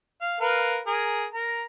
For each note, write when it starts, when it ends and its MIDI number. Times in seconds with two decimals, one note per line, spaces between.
0.21 0.37 77
0.40 0.79 70
0.40 0.79 71
0.40 0.79 77
0.87 1.25 68
0.87 1.25 70
1.34 1.64 70
1.34 1.64 82